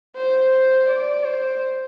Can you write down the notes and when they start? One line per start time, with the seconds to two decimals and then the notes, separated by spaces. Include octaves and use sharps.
0.17 C5
0.88 D5
1.24 C5